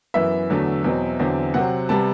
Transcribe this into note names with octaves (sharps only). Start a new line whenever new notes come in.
F#2 E3 B3 E5
E2 D3 F#3 A3
E2 B2 F#3 C4
E2 D3 F#3 C4
C3 F#3 C4 F#5
C3 G3 B3 A5